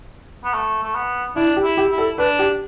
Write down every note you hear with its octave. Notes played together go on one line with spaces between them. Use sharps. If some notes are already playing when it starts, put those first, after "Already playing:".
B3
A3
A3
B3
D4 E4
G4
E4
G4
E4
A4
D4 B4
G4